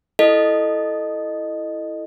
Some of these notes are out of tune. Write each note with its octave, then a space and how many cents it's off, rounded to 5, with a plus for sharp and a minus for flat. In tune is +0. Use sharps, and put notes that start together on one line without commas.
E4 +0 A4 +0 D#5 -15